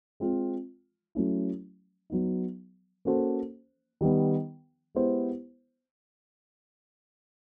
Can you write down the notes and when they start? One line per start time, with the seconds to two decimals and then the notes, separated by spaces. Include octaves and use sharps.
0.20 G#3 C4 F4
1.15 F#3 A3 C#4 E4
2.10 F#3 B3 D#4
3.05 A#3 C#4 F#4 A4 C5
4.01 D#3 G3 B3
4.95 G#3 B3 E4 G4 C5